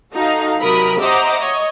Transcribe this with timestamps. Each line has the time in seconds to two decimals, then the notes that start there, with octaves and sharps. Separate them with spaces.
0.13 D#4 F#4 A4 F5 A#5
0.60 C3 F#3 A#4 B5 D#6
1.00 C5 D#5 E5 F#5 A#5 D6
1.39 C#5 D#5